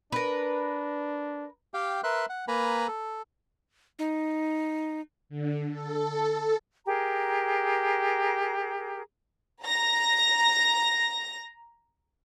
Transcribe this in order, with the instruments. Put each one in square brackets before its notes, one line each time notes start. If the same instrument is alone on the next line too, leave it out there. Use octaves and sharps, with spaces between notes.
[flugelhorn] D4 [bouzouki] A#4 B4
[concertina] G4 F5 G5
A#4 B4 E5 C6 F#6
F#5
A#3 B4 G#5 A#5 B5
A4
[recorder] D#4
[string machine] D3
A4
[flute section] G4 G#4 A#4 A#5
[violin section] A#5 A#6